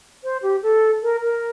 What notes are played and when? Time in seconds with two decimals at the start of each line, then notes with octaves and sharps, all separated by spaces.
0.24 C5
0.43 G4
0.63 A4
1.03 A#4
1.23 A#4